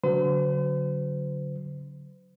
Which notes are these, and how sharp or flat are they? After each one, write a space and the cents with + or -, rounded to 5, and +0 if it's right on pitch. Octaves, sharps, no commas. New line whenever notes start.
D3 -30 F#3 +0 C5 -45